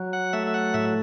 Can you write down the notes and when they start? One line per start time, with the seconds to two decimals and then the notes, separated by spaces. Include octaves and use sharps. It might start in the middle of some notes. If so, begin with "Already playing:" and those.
Already playing: F#3
0.13 F#5
0.33 A3 E5
0.47 E5
0.54 F#5
0.74 A2 E5